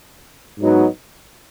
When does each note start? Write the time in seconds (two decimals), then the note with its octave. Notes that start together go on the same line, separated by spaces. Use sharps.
0.59 G#2 F#3 B3 D#4 F#4